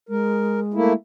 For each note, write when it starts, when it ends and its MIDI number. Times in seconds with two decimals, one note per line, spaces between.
0.09 0.95 56
0.09 0.60 70
0.74 0.93 57
0.74 0.93 58
0.74 0.93 64